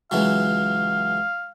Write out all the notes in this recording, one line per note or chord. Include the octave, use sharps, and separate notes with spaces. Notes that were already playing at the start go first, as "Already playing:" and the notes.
C#2 E3 F#3 F5